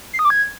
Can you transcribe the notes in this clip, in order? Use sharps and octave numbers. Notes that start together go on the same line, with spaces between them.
C7
D#6
D6
G#6